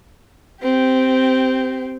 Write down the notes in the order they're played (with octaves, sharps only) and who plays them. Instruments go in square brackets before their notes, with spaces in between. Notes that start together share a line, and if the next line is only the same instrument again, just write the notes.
[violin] C4 G4